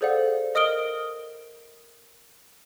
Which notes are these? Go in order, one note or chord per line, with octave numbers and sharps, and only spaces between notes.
G#4 A4 C5 D5 F5 F#5
A#4 D#5 D#6 F6 D7 G7